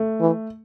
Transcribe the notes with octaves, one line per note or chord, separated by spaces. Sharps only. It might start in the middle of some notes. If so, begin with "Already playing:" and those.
Already playing: A3
E3